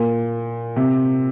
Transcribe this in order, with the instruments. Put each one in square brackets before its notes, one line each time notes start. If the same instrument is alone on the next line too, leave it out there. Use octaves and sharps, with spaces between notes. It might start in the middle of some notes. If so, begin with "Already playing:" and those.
Already playing: [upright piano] A#2
C3